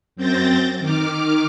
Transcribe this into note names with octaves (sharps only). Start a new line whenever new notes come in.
F#2 C4 G6 A6 A#6
D#3 D6 F6